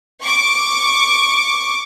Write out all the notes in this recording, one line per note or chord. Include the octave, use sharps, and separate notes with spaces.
C#6 D6